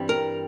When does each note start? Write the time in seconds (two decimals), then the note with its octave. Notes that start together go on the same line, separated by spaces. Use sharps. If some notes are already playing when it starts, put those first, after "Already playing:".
Already playing: G2 E3 G3 C4
0.09 A#4